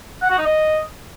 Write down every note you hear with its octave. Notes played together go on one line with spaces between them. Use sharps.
F#5
F#4
D#4
D#5